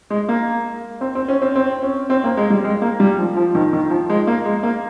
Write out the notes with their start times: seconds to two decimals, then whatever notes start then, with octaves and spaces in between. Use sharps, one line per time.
0.10 G#3
0.29 A#3
1.01 C4
1.15 C4
1.28 C#4
1.42 C4
1.56 C4
1.83 C#4
2.10 C4
2.24 A#3
2.37 G#3
2.50 G3
2.64 G#3
2.82 A#3
3.00 G3
3.18 F3
3.37 F3
3.55 D#3
3.73 D#3
3.90 F3
4.10 G#3
4.27 A#3
4.45 G#3
4.63 A#3